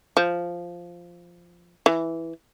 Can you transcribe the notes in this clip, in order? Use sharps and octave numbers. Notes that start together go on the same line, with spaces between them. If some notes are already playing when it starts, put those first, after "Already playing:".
F3
E3